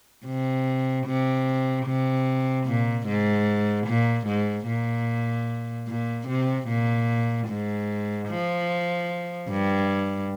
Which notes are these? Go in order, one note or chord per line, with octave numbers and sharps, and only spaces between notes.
C3
C3
C3
A#2
G#2
A#2
G#2
A#2
A#2
C3
A#2
G#2
F3
G2